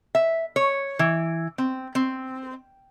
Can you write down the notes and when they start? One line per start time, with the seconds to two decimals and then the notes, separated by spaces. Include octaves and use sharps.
0.15 E5
0.56 C#5
0.99 E3
1.58 C4
1.95 C4